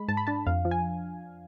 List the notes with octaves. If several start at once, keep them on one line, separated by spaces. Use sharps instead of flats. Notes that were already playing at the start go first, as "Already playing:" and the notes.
Already playing: G#3 B5
G#2 A5
B5
D4 A5
F2 F5
F3
G#5